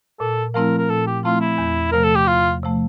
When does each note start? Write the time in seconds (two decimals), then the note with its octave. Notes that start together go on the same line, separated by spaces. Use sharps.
0.20 A#2 A4
0.54 F3 A3 C4 E4 A#4
0.78 A#4
0.89 A#2 A4
1.07 G4
1.23 F3 A3 C4 E4 F4
1.41 E4
1.58 E2
1.92 C3 F3 A3 A#4
2.04 A4
2.15 G4
2.27 E2 F4
2.63 C3 F3 A3